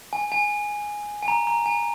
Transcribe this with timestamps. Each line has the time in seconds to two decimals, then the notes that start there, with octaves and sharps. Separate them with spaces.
0.13 G#5
0.32 G#5
1.23 G#5
1.28 A#5
1.47 A#5
1.66 G#5